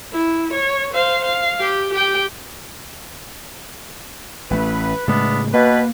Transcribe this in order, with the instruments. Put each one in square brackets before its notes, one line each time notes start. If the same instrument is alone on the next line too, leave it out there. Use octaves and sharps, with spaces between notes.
[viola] E4
C#5
C5 F5
F5
G4
G4 G5
[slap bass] A1 A3 [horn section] B4
[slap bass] A2 C#3 G#3 [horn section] B3 D4 E4
[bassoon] B2 [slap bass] A#3 [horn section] B4